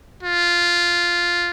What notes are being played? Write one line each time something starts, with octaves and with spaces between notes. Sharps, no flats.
F4